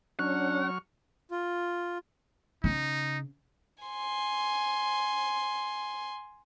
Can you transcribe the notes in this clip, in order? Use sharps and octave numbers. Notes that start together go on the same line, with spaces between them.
F#3 C#4 D4 F#5 C#6 F6
F4
C#3 D#4
G#5 C6